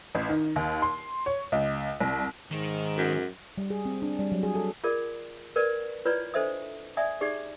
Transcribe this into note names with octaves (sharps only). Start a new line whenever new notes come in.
A1
D#3
D#2
C6
C#5
C#2
C2
G#2 D#3
F#2
G3
G#4
C4
D4
G3
F#3
G#4
A4
F4 G#4 A#4 D5
A#4 B4 D5
E4 F4 B4 C#5 D5
D4 A4 C5 D#5 E5 D#6
D5 E5 G#5 D#6
D#4 G4 G#4 D5